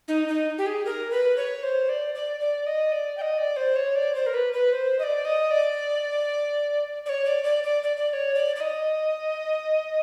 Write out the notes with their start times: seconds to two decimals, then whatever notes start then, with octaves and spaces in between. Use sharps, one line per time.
0.08 D#4
0.28 D#4
0.58 G4
0.66 G#4
0.85 A#4
1.11 B4
1.37 C#5
1.63 C5
1.89 D5
2.15 D5
2.40 D5
2.66 D#5
2.92 D5
3.17 G5
3.22 D#5
3.38 D5
3.57 C5
3.76 C#5
3.95 D5
4.15 C5
4.26 A#4
4.34 B4
4.53 B4
4.72 C5
4.99 D#5
5.03 D5
5.25 D#5
5.51 D5
7.06 D5
7.09 C#5
7.25 D5
7.44 D5
7.63 D5
7.83 D5
7.97 D5
8.09 D5
8.13 C#5
8.35 D5
8.56 D5
8.60 D#5